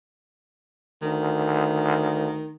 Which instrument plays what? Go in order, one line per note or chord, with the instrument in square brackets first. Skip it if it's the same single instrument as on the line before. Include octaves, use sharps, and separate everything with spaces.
[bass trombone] D2 [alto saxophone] D#3